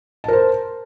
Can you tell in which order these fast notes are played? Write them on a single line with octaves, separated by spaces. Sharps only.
A5 A#4 C5